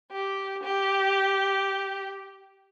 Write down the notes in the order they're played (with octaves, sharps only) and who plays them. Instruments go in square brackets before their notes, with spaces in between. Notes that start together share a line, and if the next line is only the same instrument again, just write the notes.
[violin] G4
G4